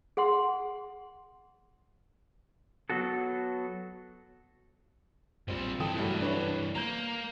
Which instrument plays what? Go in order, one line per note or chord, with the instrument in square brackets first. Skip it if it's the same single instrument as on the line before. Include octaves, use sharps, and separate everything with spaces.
[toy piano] G#4 F#5 C6
[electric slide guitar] F#3 B3 F#4 A4
[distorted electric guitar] A#2 F3 [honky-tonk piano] G3 C4
[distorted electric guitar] G2 E3 [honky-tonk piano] A4 G5 D#6
[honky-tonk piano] F#3 G3 A3
D4 B4 C#5
[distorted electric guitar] A#3 [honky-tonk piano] A#5 G6